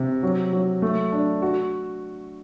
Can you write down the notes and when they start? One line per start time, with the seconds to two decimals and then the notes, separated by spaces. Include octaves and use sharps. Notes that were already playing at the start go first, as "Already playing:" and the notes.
Already playing: C3
0.23 F#3
0.53 F#3
0.82 A3
1.12 D4
1.42 F#4